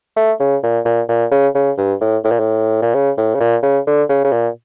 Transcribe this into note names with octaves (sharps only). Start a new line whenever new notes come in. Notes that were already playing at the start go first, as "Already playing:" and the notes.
A3
C#3
A#2
A#2
A#2
C#3
C#3
G2
A2
A2
A#2
A2
A#2
C#3
A2
C#3
A#2
C#3
D3
C#3
C#3
A#2